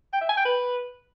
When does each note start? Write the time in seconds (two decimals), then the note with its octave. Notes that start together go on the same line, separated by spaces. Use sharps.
0.13 G5
0.21 E5
0.29 G#5
0.37 G5
0.45 B4